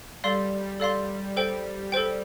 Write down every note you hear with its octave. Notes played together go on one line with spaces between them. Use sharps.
G3 A4 D5 F5 C6
A4 D5 F5 C6
A4 C5 G5
A4 C5 G5